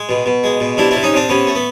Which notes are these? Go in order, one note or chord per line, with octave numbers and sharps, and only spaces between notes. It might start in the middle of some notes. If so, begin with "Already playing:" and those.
Already playing: G#3
B2
B2
G#3
B2
C3 D4 E4
C3 D4 E4
C#4 D#4
C3 C4 D4
C3 B3 C#4
A3
B3